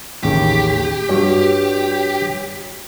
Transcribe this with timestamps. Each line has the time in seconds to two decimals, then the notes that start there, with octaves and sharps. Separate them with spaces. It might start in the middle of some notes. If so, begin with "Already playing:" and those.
0.23 A1 D#2 C#3 G4
1.09 G2 G3 F#4 C#5